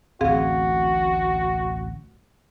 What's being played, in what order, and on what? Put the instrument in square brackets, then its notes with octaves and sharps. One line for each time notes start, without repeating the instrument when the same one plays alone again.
[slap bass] D1 A1 [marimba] C4 G#4 F5 [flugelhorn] F#4